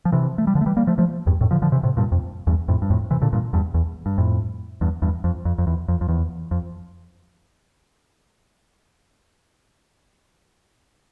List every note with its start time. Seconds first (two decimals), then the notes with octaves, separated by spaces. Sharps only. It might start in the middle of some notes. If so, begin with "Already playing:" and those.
0.05 F3
0.12 C3 E3
0.38 A3
0.47 G3
0.55 D3 F3
0.61 A3
0.66 E3 G3
0.77 G3 A#3
0.87 F3 A3
0.98 F3 A3
1.27 E2 G2
1.41 F2 A2
1.51 D3 F3
1.62 D3 F3
1.72 C3 E3
1.83 A2 C3
1.97 G2 A#2
2.12 F2
2.47 E2 G2
2.68 F2 A2
2.82 G2
2.90 F2 A2
3.11 C3 E3
3.22 A#2 D3
3.33 G2 A#2
3.53 E2 G2
3.74 E2
4.06 G2
4.18 F2 A2
4.81 E2 G2
5.02 E2 G2
5.24 F2
5.45 F2
5.58 F2
5.67 E2
5.88 F2
6.01 F2
6.09 E2
6.51 F2